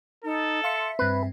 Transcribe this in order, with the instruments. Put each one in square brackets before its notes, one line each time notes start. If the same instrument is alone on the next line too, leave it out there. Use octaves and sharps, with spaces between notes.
[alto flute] D#4 [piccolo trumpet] A4
[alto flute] E5 [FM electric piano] F5 C6 C#7
[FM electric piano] G2 C4 [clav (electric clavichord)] B4